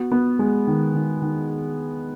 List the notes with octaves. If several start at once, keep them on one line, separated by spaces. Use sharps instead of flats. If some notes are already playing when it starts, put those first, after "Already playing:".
Already playing: B3 F#4
B3
G#3
D#3
D#3
D#3